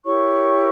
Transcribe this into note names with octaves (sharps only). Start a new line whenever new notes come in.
E4 G4 A#4 C#5 C#6